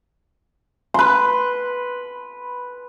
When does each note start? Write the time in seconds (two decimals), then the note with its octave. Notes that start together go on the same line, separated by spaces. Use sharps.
0.94 B4 C6